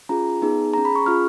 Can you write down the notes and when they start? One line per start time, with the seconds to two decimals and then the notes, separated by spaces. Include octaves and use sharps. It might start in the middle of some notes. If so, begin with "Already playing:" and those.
0.09 C#4 F4 G#4 A#5
0.42 B3 D#4 G#4
0.73 C#4 G#4 A#5
0.85 B5
0.95 C#6
1.06 C#4 F4 G#4 F6